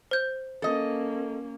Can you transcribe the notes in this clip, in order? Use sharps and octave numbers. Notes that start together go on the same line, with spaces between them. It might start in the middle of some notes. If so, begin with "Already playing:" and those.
C5 G6
A#3 C#4 A4 D#5